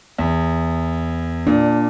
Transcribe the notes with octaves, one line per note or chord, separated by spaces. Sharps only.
E2
A#2 D4